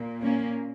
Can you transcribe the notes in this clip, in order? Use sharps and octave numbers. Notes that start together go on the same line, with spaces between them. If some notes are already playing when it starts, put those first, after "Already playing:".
Already playing: A#2
A#3 C#4